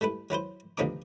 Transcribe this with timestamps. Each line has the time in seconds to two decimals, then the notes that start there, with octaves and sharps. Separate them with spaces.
0.01 G3 A3 E4 B4
0.30 F#3 E4 B4 C5
0.77 D2 C3 F3 B3 D#4 D6